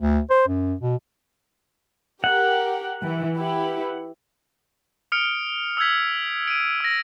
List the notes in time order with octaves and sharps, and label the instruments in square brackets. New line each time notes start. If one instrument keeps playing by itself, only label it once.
[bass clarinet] D2
C5
F#2
B2
[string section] G4 A#4 [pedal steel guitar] F#5
[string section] E3
E4 G4 B4
[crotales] D#6 F6 C#7 D7
D#6 E6 G6 G#6 B6
D7 D#7
E6 A#6